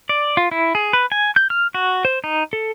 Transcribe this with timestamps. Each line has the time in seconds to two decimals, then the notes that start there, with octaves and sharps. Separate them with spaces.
0.09 D5
0.37 F4
0.51 E4
0.75 G#4
0.93 B4
1.12 G#5
1.36 G6
1.50 F6
1.74 F#4
2.05 C5
2.24 D#4
2.53 A4